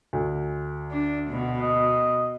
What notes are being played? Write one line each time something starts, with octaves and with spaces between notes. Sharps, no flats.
D2
D4
B2
D#5